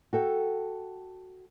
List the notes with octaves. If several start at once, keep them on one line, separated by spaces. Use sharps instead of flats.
F#4 A4 G5